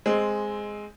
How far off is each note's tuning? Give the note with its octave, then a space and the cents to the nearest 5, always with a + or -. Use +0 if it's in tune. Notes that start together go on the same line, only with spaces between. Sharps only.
G#3 +0 C4 +0